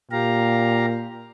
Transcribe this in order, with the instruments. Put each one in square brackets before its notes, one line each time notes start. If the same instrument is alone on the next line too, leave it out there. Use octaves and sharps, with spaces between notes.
[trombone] A#2 [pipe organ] G4 F5 A#5